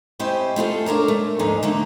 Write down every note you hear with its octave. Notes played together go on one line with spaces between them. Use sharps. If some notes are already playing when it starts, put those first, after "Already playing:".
C4 C#4 E4 G4 C5 D#5
A3 F4 G#4 A4
D4 A#4 C#5 A#5
A3
D#2 G#2 F3 G#3 D4 D#4
D3 A3 A#3 D#4